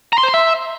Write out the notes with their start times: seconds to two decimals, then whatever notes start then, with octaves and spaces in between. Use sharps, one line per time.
0.13 A#5
0.18 C6
0.23 C5
0.29 C6
0.34 E5